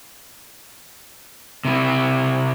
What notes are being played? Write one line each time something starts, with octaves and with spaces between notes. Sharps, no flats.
C3 E4